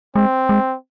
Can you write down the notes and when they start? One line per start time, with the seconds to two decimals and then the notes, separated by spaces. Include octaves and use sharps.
0.16 G#3 C4
0.49 G#3